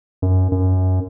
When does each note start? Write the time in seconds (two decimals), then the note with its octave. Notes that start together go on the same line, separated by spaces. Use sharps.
0.22 F#2
0.52 F#2